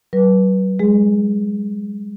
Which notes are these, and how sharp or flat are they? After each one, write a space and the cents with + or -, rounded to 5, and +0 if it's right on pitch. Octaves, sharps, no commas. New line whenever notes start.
F#3 +35 B4 -25
G#3 -15 G#4 +0